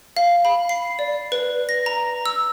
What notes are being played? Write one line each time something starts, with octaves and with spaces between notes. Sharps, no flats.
F5
B5
C7
D5
B4
A#6
A#5
E6